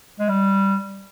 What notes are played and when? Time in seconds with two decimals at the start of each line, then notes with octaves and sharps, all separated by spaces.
0.19 G#3
0.29 G3